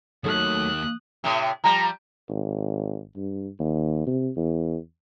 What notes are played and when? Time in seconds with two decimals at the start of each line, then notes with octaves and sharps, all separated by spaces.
0.24 D#2 D#3 F#3 A3 D#6 F#6
1.24 A2 C3
1.64 F3 G3 A#5
2.29 G#1
3.16 G2
3.59 D#2
4.07 C3
4.36 E2